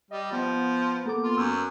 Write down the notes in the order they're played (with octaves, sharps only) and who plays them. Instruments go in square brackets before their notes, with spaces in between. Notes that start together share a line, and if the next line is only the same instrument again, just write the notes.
[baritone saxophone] G3 [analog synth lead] D#5
[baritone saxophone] F3 [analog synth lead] B3
[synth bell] A#3 A4 D6
[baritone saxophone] F4
[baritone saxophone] F#2 [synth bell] E6